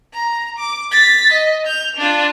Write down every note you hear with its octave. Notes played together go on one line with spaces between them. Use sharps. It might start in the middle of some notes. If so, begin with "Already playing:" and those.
A#5
D6
A6 B6
D#5
G6 F7
D4 F4